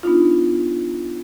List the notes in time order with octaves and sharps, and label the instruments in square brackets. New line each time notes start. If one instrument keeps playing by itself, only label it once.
[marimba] B3 D4 D#4 F4